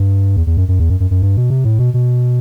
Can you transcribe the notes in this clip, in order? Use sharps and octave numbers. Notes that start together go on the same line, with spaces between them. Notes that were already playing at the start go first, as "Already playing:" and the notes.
Already playing: G2
E2
E2
F#2
F#2
E2
F#2
F#2
F#2
G2
B2
C3
A2
B2
B2